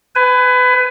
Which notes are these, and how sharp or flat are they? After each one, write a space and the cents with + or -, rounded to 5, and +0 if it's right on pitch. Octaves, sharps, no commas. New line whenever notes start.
B4 +25 G#5 +0